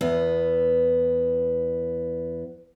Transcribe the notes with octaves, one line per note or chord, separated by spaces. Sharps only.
E2 B3